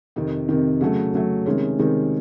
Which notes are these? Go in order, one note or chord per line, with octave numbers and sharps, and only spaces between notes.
F2 C3 D#3
F2 C3 D#3
C#3 F#3 A3
C#3 F#3 A3
C3 D#3 G#3 C#4
C3 D#3 G#3 C#4